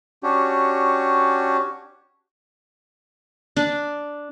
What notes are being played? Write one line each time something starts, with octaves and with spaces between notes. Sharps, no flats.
C#4 D4 F#4 G4
D4